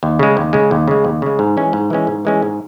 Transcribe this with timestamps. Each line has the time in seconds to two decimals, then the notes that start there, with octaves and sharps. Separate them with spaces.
0.03 D#2
0.19 C#3 G#3
0.37 D#2
0.53 C#3 G#3
0.71 D#2
0.88 C#3 G#3
1.04 D#2
1.22 C#3 G#3
1.39 G#2
1.57 E3 G#3 C#4
1.73 G#2
1.90 E3 G#3 C#4
2.07 G#2
2.25 E3 G#3 C#4
2.42 G#2